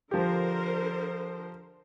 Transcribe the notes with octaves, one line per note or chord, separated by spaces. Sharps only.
D3 F3 G4 A#4 C5